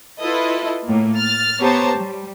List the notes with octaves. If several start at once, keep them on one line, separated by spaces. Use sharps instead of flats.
E4 F4 A4 B4 D#5
A2 A#3
F6 A6
B3 G4 C5 C#5 A5 A#5
G3